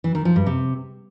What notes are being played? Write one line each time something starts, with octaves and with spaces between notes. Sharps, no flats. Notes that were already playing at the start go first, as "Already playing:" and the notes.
E3
D#3
F3
G2
C3